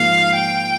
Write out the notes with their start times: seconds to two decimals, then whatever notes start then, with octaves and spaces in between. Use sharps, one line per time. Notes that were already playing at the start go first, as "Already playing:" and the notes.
Already playing: G#2 F3 A#3 F5
0.35 G5